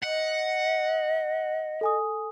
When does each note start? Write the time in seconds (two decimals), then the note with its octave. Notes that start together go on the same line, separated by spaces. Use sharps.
0.03 D#5 F#5
1.81 A4 G#5 D#6